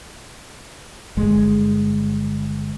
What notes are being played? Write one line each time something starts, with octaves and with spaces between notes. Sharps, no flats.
G1 G#3